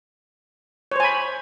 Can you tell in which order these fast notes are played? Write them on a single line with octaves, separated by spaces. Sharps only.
C#5 C5 G#5 B5